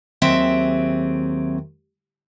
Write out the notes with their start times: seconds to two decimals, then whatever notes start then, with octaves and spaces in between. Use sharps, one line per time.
0.22 D#2 F#3 C4 G#4 E5